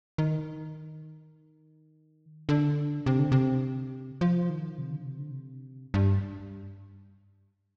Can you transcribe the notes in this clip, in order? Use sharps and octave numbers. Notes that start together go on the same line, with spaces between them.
D#3
D3
C3
D3
C3
F3
D#3
C3
D3
C3
D3
C3
G2